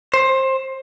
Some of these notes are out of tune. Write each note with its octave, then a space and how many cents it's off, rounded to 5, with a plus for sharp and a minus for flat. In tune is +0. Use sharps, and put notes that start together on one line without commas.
C5 +20